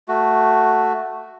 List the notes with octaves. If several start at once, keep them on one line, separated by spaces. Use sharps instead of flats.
A3 F#4